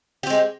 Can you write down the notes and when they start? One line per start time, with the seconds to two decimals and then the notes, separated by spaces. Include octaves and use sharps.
0.23 G4
0.27 C4
0.30 G#3